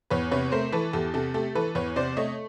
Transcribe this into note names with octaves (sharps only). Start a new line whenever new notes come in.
E2 B4 C#5
C3 B4 C#5
A3 A#4 C5
E3 A4 B4
E2 G4 A4
C3 G4 A4
A3 G4 A4
E3 A4 B4
E2 B4 C#5
C3 C5 D5
A3 C#5 D#5